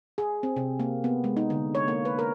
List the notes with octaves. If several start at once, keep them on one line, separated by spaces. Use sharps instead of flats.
G#4
C4
C3
A#3
B3
G#3
D#4
D3
C#5
A#3
B4
A#4